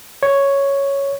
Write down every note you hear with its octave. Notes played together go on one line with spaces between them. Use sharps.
C#5